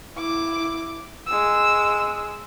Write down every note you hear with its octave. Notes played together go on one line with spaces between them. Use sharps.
E4 D6
G#3 E6